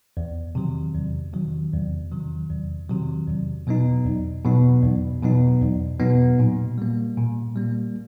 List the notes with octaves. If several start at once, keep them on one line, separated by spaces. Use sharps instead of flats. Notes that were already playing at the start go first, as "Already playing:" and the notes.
E2
C3 D#3 F#3
E2
C3 D#3 F#3
E2
C3 D#3 F#3
E2
C3 D#3 F#3
E2
B2 F#3 B3 D#4
E2
B2 F#3 B3 D#4
E2
B2 F#3 B3 D#4
E2
B2 F#3 B3 D#4
A#2
G3 A#3
A#2
G3 A#3